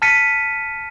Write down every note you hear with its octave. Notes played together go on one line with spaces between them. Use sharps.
A5 F6 A6 B6 C#7 D#7